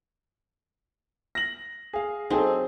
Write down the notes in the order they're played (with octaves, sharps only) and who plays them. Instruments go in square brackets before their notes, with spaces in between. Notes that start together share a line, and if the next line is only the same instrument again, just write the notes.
[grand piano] A#6 F#7
G#4 F5
[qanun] F#3 C4 [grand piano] D#4 G#4 A4